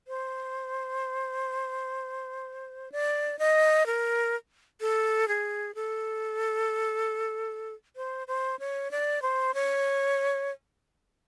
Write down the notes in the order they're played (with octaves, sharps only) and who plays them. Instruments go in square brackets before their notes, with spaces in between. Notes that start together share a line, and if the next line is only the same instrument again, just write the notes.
[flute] C5
D5
D#5
A#4
A4
G#4
A4
C5
C5
C#5
D5
C5
C#5